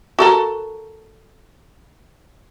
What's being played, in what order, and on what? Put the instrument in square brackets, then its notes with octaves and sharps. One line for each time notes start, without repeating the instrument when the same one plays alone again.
[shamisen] F#4 A4 A#4